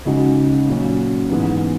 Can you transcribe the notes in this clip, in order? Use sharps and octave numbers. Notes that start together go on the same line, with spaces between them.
C#2 C#3 G#3 D#4 F#4
A#2 F#3 C#4
G#2 E3 B3